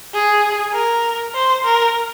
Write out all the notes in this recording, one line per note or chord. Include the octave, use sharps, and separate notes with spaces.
G#4
A#4
C5
A#4